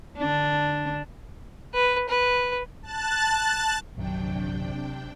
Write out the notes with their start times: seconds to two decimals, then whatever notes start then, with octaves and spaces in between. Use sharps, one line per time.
0.18 D3 D4
1.74 B4
2.09 B4
2.82 A5 F#6 A6
3.97 A#1 F#2 C3 D#3 F#3 D4 G5